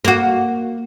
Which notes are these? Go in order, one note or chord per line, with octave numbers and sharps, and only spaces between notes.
A#3 F#4